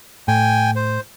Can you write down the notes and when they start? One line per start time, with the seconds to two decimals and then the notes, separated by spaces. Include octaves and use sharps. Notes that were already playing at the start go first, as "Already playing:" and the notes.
0.28 A2 G5 G#5
0.76 C5